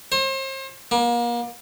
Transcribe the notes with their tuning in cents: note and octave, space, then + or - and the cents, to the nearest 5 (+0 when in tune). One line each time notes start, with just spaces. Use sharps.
C5 +40
A#3 +35